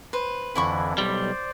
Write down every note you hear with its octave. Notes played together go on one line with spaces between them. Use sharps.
B4 C5
F2 D3 E3 E4 B5 C#6
B1 G3 C5 D5